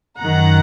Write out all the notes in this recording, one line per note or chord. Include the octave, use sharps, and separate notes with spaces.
F#2 D#3 F#5 A#5